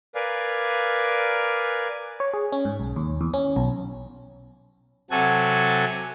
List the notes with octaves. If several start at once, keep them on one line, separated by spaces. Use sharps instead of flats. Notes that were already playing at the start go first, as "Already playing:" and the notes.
A#4 B4 D5 F5 G#5
C#5
G#4
C#4
G#2
B1
D#2
E2
C#4
B1
C3 F#3 F#4 A4 G#5